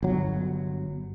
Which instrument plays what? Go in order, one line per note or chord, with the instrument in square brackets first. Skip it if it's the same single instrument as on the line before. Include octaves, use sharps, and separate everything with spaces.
[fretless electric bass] G1 F#3